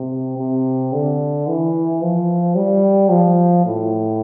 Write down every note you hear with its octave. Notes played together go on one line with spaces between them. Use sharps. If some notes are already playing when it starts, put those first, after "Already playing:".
Already playing: C3
C3
D3
E3
F3
G3
F3
A2